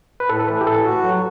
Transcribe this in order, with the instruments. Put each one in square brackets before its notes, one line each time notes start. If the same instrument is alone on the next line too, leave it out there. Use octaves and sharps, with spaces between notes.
[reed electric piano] B4
[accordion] A2 [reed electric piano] A4
[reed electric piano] A4
[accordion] E3 [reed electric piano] B4
[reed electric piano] G4
[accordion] A2 [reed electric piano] A4
[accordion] F#4
F#3